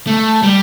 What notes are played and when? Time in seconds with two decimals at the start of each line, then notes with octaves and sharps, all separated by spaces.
0.07 A3
0.43 G3